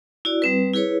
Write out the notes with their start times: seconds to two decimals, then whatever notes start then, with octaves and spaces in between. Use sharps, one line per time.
0.25 E4 F#4 D5
0.42 G3 C4 B4
0.73 E4 G#4 B4 C#5